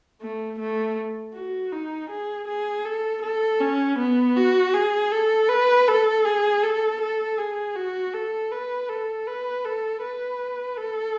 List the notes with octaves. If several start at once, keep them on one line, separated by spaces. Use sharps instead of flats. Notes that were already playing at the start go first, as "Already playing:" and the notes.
A3
A3
F#4
D#4
G#4
G#4
A4
A4
C#4
B3
F#4
G#4
A4
B4
A4
G#4
A4
A4
G#4
F#4
A4
B4
A4
B4
A4
B4
A4